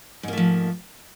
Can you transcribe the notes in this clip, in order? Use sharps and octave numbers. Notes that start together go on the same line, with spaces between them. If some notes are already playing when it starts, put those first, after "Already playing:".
G#2 F3 A3 A#3